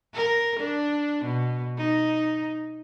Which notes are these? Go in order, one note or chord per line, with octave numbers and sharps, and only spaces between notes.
A#4
D4
B2
D#4